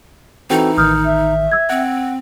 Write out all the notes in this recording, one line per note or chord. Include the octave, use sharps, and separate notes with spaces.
E3 C4 D#4 F#4 A4 G5
A1 D#3 D#6 F6 G6
E5
E6 G#6
C4 F#5